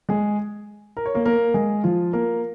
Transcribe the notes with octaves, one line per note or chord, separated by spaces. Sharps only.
G#3 G#4
A#4
C#5
A#3 A#4
A#3 A#4
G#3 G#4
F3 F4
A#3 A#4